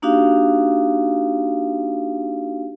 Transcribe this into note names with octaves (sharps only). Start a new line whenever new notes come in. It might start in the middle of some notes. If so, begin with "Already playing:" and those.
A#3 D4 D#4 F#4 G4 F5